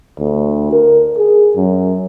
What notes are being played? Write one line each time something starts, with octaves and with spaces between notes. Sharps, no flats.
D2
A#4
G#4
F#2